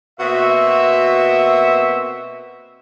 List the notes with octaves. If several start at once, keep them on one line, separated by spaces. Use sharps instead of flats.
B2 A#3 C4 F#4 E5